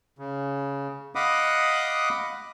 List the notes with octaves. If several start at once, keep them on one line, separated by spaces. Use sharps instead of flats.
C#3
D#5 F5 F#5 B5 D6 D#6